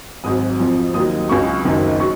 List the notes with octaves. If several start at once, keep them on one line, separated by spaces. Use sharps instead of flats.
G#1 G#2 F#3 D#6
F2 F3
D#2 D#3 F#3 D#6
C#2 C#3 F#3 C#6
F#1 F#2 D#3 F#3
F#3 C#6